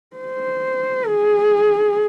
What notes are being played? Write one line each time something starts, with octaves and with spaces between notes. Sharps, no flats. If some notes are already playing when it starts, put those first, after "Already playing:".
C5
G#4